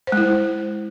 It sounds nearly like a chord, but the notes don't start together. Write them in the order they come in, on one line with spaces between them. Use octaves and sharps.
C5 G#3 E4